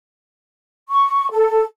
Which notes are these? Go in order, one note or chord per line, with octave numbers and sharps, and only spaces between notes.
C#6
A4